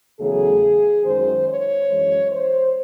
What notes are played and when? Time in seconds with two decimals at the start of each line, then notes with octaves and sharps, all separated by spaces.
0.20 E2 C#3 F#3 A3 G#4
1.05 F#2 D#3 G#3 C5
1.48 C#5
1.89 F#2 E3 G#3
2.32 C5